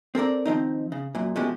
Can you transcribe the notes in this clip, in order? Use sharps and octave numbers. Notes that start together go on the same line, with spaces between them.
C4 A4 A#4 D5
D#3 F3 C4 D#4
C#3
F#2 A#2
B2 F3 G#3 A3 C#4 G4